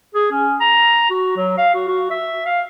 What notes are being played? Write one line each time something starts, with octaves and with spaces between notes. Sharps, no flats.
G#4
C#4
A#5
F#4
F#3
F5
F#4
F#4
E5
F5